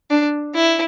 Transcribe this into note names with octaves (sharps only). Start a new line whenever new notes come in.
D4
E4